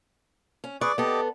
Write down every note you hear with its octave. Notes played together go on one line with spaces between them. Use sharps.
C#4
G#4 B4 D5 C#6
B3 G4 A4 D#5 D6